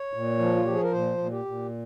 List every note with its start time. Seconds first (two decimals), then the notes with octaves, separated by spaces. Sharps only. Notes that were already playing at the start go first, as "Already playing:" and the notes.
Already playing: C#5
0.13 A#2
0.39 F3
0.56 F4
0.65 F3 G4
0.73 G#4
0.83 A#4
0.92 A#2 C5
1.18 A#2
1.32 G4
1.45 A#2